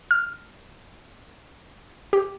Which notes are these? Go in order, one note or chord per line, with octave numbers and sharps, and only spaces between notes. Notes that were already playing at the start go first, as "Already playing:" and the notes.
F6
G4